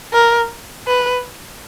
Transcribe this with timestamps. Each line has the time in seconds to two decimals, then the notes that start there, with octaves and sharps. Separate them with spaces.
0.13 A#4
0.88 B4